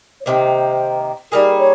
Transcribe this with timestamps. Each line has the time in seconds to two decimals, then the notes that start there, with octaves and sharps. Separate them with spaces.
0.21 C#5
0.25 C3 D#3 A#3 C5
1.32 G3 A#3 D#4 G#4 A#4
1.58 C#5